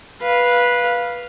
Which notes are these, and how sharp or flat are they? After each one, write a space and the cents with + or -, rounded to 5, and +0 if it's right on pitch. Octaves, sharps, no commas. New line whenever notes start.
B4 -15 F5 +0